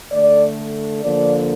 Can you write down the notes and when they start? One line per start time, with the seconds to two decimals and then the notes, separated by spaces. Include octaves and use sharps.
0.12 D3 A3 D5
1.02 D3 F3 A#3 D5